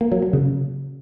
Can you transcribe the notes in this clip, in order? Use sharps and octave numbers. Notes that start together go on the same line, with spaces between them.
A#3
F#3
F#3
C#3